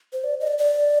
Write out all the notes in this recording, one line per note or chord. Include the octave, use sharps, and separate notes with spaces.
C5
D5
D#5
D5
D5